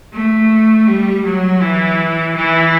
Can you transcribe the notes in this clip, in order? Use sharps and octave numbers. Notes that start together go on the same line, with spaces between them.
A3
G3
F#3
E3
E3